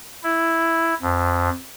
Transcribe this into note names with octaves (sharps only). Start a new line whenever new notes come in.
E4
F2